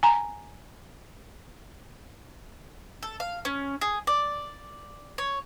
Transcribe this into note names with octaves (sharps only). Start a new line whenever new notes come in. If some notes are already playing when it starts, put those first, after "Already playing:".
G#5 A#5
A4
F5
C#4
G#4
D5
C#5